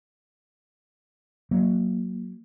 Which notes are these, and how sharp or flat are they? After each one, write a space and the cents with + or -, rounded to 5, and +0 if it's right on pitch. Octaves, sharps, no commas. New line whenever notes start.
F#3 +0 A#3 +0